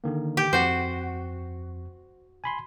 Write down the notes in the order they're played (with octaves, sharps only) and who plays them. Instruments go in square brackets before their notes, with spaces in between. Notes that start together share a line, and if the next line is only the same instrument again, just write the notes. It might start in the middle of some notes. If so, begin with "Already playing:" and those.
[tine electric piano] D3 D#3 A#3
[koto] G4
[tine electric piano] F2 [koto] F#4 C5
[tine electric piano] G#5 B5 C6